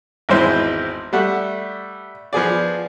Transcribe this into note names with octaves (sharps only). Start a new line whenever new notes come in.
G#1 E2 G#3 E4 C5
G3 A3 F#5
F3 B3 G#4 D5